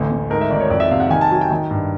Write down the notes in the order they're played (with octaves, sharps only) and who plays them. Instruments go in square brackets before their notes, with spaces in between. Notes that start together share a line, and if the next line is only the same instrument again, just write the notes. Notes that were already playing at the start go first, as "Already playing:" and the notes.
Already playing: [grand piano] A1 D2
D2
G#2 A#4
E5
G#1 D5
C#5
F2 D5
E5
C3 F5
F#5
D#3 G#5
A5
F#3 G#5
G5
D#3
G2